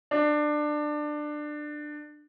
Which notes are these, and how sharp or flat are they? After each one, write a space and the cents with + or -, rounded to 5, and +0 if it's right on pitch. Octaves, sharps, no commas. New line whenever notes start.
D4 +20